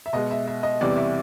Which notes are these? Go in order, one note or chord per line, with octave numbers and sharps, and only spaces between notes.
E5
B2 G#3 D#5
E5
E5
D#5
E2 C3 E3 G3 D5
E5